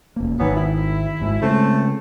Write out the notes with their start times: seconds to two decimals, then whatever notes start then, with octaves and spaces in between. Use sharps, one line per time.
0.16 E1 A#3
0.40 G#1 D#3 E3 F#3 B3
0.56 E4
1.20 G#1 G#2 G#3
1.41 C#3 G#3 A3 C4